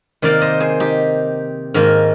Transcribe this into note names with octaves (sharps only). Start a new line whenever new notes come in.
C3 D#3 A#3 D5 F5
C5 D#5
G#4 C5
D#4 G4
G#2 D#3 A#3